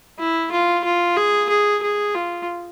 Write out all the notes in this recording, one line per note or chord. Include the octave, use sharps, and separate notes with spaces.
E4
F4
F4
G#4
G#4
G#4
F4